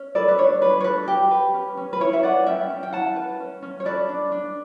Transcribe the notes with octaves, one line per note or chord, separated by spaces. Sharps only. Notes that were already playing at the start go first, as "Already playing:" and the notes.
Already playing: C#4
A4 B4 D5
B4
D4 C#5
D4 B4
C#5
A4 B4
G4
B4
C#4
C#4
B4
E4 C#5
E5
B4 D5 F#5
C#4 E5 G5
C#4
G5
E4 F#5 A5
B4
C#4
C#4
C#5
A4 B4 D5
D4
D4